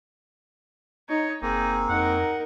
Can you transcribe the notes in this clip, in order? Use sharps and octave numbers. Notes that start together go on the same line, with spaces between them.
D#4 C#5
F#1 A#3 C4 D#4 G#4
F2 D#4 A#4 F#5